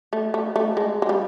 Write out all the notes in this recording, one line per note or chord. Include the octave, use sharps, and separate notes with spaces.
A3
A3
A3
G#3
G#3
G3